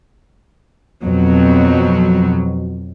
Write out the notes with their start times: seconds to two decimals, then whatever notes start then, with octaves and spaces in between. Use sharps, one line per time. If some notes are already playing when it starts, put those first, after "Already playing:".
1.03 F2 B2 F#3